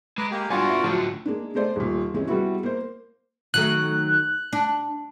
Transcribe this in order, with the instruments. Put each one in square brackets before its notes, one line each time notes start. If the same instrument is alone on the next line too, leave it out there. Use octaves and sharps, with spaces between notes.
[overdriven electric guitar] G#3 [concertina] B4 A#5 D6
[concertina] A#3 G4
[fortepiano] G2 G#5 [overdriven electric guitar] B3 F5 [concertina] F4 F#4 D5
[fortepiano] E4
[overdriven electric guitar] A2 D3 [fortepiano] F3 F#3
[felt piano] G#3 A#3 D4
G#3 A3 C5 D5
D#1 A#2
E3 G#3 C4 C#4
G3 G#3 B3 E4 F#4
A#3 C5
[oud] D#3 F#3 A3 [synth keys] F#6
[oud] D4